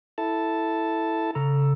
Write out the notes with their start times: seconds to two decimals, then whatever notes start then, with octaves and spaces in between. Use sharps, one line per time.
0.18 E4 A4 A5
1.35 C#3 A4 A#5